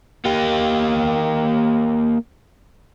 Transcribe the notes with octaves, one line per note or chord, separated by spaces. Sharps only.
A#3 G4